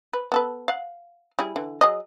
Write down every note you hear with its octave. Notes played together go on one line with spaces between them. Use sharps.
B4
B3 A4 B4
F5 F#5
G3 E4 G#4
D3 E3
F#3 G#4 D#5